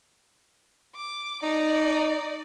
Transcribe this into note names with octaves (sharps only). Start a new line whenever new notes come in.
D6
D#4 D5